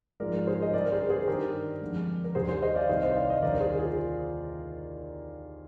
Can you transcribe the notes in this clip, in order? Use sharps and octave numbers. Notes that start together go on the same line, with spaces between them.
G#2 F3 G#3 A#4 D5
G#4 C5
D#5
G2 D3 G3 A#4 D5
A#4
G#4 C5
G#4 C5
G2 D#3 G3 G4 A#4
F2 D3 G#3
A#4
D#2 D#3 G3 G#4 C5
G#4 C5
C5 D#5
D5 F5
C2 C3 D#3 G3 C5 D#5
C5 D#5
D5 F5
C5 D#5
D#2 D3 G3 A#4 D5
G#4 C5
F4 G#4